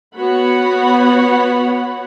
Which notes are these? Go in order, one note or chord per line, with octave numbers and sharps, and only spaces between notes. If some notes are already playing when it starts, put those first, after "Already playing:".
B3 F#4 C#5 F#5 B5